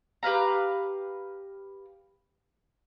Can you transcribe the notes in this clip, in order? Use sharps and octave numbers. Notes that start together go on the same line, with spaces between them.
G4 B4 F5 A#5